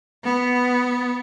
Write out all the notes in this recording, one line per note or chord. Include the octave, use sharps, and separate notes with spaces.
B3